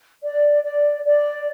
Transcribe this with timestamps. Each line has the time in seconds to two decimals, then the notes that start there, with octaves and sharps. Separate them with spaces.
0.23 D5
0.63 D5
1.05 D5